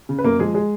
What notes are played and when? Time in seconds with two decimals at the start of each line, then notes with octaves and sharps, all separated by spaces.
0.09 C#3
0.19 B4
0.24 F#2 A#3 A#4
0.39 F3 G#3 G#4
0.54 G#3 G#4